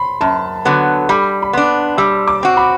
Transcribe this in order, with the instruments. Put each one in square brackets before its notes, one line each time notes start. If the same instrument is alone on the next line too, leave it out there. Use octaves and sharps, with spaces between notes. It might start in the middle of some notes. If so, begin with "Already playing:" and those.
Already playing: [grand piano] B5 C6
[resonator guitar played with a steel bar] F#2 [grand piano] A5
[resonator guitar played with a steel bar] D3 F#3 B3
[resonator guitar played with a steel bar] G3 [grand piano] B5
[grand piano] B5
[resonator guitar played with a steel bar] B3 D4 [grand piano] C6
[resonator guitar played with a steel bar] G3 [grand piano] E6
[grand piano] D6
[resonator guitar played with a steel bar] C4 F#4
[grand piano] B5